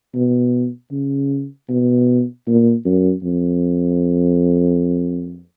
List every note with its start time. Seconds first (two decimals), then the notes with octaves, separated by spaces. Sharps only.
0.14 B2
0.92 C#3
1.69 B2
2.47 A#2
2.85 F#2
3.23 F2